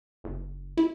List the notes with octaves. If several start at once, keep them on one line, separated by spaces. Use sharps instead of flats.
F#1
E4